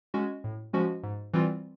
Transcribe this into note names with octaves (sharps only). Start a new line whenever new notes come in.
G#3 C#4 F#4
A2
F3 G#3 C#4 F#4
G#2
E3 G3 C4 F4